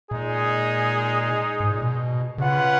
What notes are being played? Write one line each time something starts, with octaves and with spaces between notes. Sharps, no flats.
A#2 G#3 D#4 G#4
G#2
A#2
B2
C#3 C#4 F4 B4 F#5